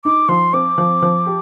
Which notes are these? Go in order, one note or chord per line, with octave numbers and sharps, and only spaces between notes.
D#4 D6
F3 C6
C4 D6
F3
F3
G4